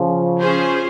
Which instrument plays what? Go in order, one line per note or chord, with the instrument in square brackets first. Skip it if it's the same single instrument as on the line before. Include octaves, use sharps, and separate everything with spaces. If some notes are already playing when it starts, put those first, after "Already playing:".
Already playing: [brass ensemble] C#3 F3
[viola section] C#4 F4 G#4 C5